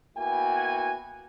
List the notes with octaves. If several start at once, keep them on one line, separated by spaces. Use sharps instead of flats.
A#3 B3 E4 F#4 G5 G#5